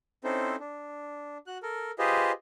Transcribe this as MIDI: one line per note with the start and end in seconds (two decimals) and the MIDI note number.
0.24 0.56 60
0.24 0.56 61
0.24 0.56 63
0.24 0.56 64
0.24 0.56 69
0.24 0.56 72
0.60 1.38 62
1.47 1.58 66
1.47 1.58 90
1.63 1.91 69
1.63 1.91 70
1.99 2.32 65
1.99 2.32 67
1.99 2.32 68
1.99 2.32 71
1.99 2.32 72
1.99 2.32 75